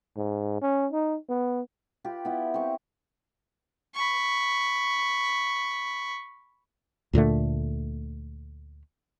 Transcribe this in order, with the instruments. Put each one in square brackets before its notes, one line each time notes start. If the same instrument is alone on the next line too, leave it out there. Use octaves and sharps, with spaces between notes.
[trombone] G#2
C#4
D#4
B3
[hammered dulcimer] F4 G4 B4
B3 E4
C4 C#6
[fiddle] B5 C#6
[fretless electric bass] D2 A#2 D3 A3